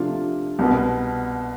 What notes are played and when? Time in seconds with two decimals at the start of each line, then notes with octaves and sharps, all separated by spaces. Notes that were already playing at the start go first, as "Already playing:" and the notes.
Already playing: C3 F3 A3 D4 F4
0.59 C2 B2 B3